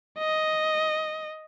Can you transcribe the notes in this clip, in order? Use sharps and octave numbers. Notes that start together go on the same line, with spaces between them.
D#5